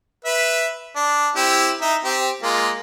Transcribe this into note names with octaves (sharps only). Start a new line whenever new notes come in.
B4 E5
D4
C4 E4 G4
D#4 E5
C4 G4
G#3 A#3 F4